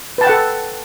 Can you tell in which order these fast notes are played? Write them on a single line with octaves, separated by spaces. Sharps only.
B4 A5 G5 F#5 A4